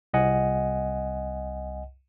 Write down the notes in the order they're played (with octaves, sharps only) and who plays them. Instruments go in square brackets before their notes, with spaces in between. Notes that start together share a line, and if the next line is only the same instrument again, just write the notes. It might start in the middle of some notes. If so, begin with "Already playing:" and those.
[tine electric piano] C2 D#5 F#5 G#5